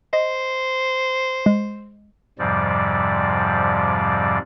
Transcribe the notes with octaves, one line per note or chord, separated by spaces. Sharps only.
C5 D#5
G#3
F2 G#2 C3 F3 G3 D5